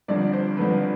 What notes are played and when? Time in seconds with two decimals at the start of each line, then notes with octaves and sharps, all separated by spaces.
0.08 G1 G2 D3 F3 C4 D5
0.33 C5
0.57 G1 G2 D3 F3 C4 B4